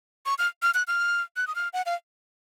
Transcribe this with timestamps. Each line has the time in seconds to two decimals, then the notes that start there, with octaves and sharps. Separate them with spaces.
0.26 C#6
0.38 F6
0.62 F6
0.74 F#6
0.88 F6
1.36 F#6
1.47 D#6
1.55 F6
1.73 F#5
1.86 F5